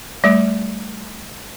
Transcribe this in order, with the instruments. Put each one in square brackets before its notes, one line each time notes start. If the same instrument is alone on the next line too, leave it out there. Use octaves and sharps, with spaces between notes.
[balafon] G3 A3